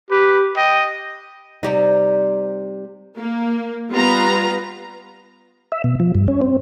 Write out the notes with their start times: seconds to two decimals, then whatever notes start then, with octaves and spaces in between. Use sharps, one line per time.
0.11 G4 B4
0.56 D#5 G5
1.63 C3 G3 D#4
3.18 A#3
3.91 G3 B3 F4 B4 A#5
5.72 E5
5.84 B2
6.00 F3
6.15 G2
6.28 C#4
6.41 C4